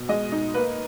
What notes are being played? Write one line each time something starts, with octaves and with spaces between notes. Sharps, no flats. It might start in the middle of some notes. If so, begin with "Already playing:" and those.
Already playing: B2
G#3 D#5
D#4
A#3 B4